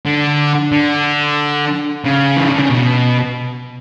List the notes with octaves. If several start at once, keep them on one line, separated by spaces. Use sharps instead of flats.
D3
D3
C#3
E3
D3
C#3
B2